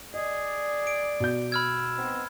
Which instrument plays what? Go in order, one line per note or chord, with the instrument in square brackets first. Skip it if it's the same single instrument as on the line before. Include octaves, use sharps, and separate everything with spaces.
[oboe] G#4 [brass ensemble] D5 [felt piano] D#5
[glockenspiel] D7
[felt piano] B2 G6
[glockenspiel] B5 F6 G#6 [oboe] E6
[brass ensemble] B3 C4 D#4